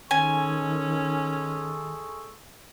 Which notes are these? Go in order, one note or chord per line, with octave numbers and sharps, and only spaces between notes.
D#3 G#3 C#4 A4 G#5 C#6